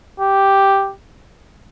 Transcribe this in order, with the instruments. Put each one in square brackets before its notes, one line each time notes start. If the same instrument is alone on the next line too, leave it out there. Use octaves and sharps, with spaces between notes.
[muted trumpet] G4